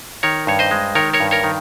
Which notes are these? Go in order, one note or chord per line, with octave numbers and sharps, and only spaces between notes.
D#3 A#4 C#5
G2 C#5
C5 D#5
G#3
D#3 A#4 C#5
A#4 C#5
G2
A#4 C#5
D#3